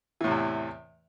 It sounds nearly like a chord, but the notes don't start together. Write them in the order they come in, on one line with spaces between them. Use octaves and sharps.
E3 A2 C3 E2